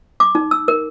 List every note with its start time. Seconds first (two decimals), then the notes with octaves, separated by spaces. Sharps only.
0.20 D6
0.35 D#4
0.51 E6
0.68 A#4